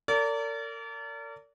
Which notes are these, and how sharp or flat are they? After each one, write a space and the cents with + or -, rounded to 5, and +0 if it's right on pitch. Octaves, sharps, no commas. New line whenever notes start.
A#4 -35 D5 -35